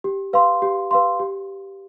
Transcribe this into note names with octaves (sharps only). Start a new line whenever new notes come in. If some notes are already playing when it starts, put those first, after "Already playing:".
G4
B4 F5 C6
G4
B4 F5 C6
G4